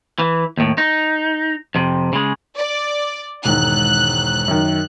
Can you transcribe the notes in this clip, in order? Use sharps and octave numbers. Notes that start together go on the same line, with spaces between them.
E3
D#2 A2
D#4
F2 C3
C#3 G#3
D5
E1 G#2 D#3 F#6
F#2 D#3